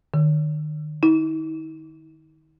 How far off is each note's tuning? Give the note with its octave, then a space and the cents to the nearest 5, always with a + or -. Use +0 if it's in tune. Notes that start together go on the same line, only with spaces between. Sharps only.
D#3 -35
D#4 +45